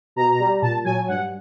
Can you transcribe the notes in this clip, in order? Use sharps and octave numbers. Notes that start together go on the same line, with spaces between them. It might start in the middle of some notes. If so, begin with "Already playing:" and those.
B2 A#5
G3
A#2 A5
F#3 G#5
G2 F#5